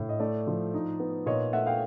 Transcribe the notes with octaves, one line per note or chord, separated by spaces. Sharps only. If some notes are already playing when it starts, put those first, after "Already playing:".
Already playing: A2
D#5
A3 D5
F3
D#4
B3
A#2 C#5 D#5
A3 E5 F#5
F5 G5